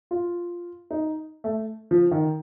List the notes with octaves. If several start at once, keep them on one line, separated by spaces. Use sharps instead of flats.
F4
D#4
A3
F3
D#3